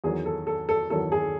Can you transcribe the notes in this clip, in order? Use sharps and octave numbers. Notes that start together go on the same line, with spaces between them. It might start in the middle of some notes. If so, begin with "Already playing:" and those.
E2 D#3 F#3 G#4
A4
A4
A4
E2 D#3 F#3 A4
G#4